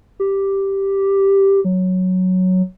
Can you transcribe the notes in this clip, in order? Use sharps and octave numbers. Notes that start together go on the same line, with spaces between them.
G4
F#3